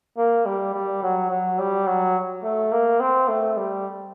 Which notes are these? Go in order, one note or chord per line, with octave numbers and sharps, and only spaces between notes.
A#3
G3
G3
F#3
F#3
G3
F#3
A3
A#3
C4
A3
G3